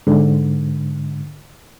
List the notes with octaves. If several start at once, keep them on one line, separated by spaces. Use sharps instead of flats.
G#2 D3